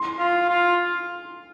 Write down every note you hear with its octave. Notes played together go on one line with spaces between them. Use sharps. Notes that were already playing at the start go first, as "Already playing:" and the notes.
Already playing: C6
F4
F4